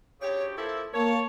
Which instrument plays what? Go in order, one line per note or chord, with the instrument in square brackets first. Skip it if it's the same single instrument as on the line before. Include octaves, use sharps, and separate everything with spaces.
[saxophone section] D2 C#3 G4 [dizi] C#5
[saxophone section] F3 A#3 E4 [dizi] A4
[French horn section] A#3 [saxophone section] C#5 [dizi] A5